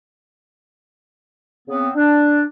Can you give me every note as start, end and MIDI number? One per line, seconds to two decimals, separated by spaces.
1.68 1.89 49
1.68 1.89 59
1.68 1.89 60
1.95 2.43 62